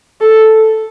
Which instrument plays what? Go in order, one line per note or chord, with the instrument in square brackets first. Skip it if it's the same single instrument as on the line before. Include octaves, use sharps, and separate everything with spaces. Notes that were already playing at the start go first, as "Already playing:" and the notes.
[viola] A4